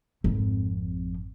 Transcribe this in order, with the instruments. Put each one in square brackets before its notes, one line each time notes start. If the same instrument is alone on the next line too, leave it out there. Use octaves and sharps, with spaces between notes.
[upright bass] G#1 F2